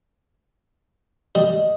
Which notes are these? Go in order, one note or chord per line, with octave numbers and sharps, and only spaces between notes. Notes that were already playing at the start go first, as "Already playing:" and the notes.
G3 D#5